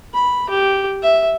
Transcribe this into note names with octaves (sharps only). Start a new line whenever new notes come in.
B5
G4
E5